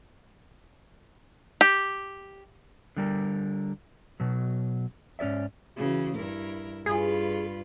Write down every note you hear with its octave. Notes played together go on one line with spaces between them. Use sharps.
G4
D3 G3 A#4
B2 F#3
G#2 C#4 A4 D5 E5
C#3 E3 F#4
G2 E4 A#4
G2 F4 G#4 B4